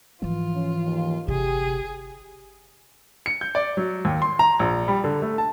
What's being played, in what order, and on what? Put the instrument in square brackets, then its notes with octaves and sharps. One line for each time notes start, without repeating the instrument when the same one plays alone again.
[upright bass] G#2 F3 [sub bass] E3 [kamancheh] F4
[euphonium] C#4
D#2
[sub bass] G1 [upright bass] C3 [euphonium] G4 [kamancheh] G#4
[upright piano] C#7
G6
D5
F#3
D#2
C6
A#5
A#1
G3
D3
A3
A5